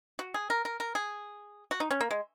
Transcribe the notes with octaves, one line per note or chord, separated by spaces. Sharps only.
F#4
G#4
A#4
A#4
A#4
G#4
F#4
D#4
C#4
A#3
G#3